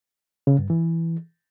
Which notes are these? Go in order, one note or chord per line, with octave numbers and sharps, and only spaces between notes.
C#3
G2
E3